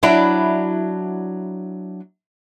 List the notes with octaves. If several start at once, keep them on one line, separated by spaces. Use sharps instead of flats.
F#3 D4 E4